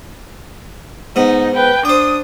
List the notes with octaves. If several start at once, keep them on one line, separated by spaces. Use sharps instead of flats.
G#2 B3 D#4
B4 G5
D4 C5 G5 D#6